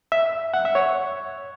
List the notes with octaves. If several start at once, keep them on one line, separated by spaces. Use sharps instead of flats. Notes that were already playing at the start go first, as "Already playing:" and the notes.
E5
F#5
E5
C#5